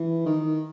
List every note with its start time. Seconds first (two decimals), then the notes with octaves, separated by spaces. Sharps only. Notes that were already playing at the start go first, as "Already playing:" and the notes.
Already playing: E3
0.26 D#3